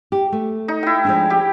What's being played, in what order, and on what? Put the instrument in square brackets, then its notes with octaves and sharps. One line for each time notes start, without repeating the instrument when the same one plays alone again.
[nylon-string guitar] G4
A3
[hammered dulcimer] D#4
E4 G5
[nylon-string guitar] F3 G#3 D4
[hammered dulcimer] G4